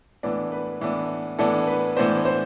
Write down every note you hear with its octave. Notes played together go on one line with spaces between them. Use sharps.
A2 E3 B3 D4
B4
A2 E3 B3 D4
A2 E3 B3 D4 A4
B4
A2 E3 B3 D4 C5
C5